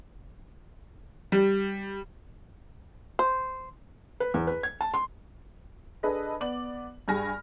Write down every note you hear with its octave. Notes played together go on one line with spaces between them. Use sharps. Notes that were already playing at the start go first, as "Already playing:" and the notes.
G3
C5
B4
E2
B4
G#6
A5
C6
D4 G#4 A4 B4 D#5
B3 D5 D6 F#7
G2 G4 G#4 G#5 F6 A#6